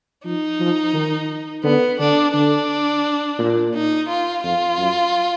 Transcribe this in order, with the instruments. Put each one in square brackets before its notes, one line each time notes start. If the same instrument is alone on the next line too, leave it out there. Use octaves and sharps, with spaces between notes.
[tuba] F3 [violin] D#4
[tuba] F3
D#3
[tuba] D3 [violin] B3
[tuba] D3 [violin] D4
[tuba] D3 [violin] D4
[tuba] A#2
[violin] D#4
F4
[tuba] F2 [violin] F4
[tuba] F#2